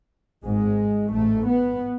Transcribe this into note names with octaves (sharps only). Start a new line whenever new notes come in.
G#1 G#2 G#3
A1 G#2 A3
B3